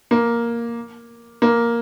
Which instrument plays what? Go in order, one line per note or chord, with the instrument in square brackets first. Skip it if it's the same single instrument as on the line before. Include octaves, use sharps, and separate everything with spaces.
[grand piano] A#3
A#3